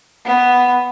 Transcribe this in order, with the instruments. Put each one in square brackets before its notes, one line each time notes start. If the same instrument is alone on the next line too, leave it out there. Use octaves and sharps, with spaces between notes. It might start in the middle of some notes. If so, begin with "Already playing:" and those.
[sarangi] B3